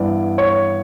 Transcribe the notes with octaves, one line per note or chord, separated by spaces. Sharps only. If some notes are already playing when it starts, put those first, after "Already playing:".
Already playing: G2 E3 B3 D5
C#5